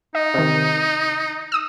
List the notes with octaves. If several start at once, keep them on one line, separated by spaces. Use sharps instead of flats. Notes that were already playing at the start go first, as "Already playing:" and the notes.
D#4 D#5
C3 D#3
D#6 E6